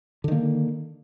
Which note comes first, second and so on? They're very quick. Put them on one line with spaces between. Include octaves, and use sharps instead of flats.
D3 D#3 A#3